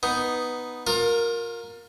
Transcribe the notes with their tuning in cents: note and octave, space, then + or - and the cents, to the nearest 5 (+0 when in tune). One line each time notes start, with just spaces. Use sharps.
B3 +0 D#4 +0
F4 +30 A#4 +0